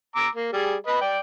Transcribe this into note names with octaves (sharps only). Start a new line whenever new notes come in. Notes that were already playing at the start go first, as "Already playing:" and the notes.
A#5 D6 E6
A#3
G3 G#4
B4 D#5 B5
D5 G5